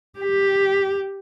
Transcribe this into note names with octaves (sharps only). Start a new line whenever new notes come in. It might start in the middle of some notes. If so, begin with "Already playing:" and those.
G4